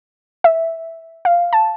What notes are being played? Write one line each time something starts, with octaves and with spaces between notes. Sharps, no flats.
E5
F5
A5